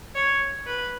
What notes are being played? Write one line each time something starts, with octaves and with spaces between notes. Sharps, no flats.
C#5
B4